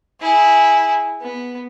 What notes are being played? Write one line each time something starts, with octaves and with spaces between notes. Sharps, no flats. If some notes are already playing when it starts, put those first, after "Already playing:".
E4 G#4
B3